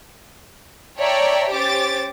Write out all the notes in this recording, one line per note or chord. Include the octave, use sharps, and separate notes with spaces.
C#5 D5 E5 G5 A5 A#5
C#4 G4 C5 D6 A6